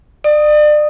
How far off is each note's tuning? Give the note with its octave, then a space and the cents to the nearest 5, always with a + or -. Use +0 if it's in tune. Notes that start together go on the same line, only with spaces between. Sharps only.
D5 +35 D#6 +0